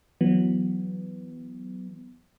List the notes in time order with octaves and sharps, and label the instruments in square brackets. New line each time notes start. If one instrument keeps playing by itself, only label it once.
[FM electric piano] E3 F#3 B3